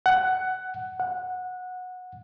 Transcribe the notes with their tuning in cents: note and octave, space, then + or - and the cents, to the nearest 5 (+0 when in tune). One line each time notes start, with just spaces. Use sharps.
F#5 +15
F#5 -15